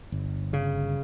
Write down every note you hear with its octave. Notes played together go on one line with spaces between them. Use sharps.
G1
C#3